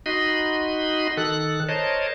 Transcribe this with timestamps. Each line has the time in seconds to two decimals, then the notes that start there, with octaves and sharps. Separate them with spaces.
0.06 D#4 F#4 D#5 B5 C6
1.17 D#3 A4 F#6
1.68 A#4 C5 C#5 D#5 A5